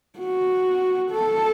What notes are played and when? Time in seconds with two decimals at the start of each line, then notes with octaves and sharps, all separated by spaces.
0.19 F#4
1.11 A4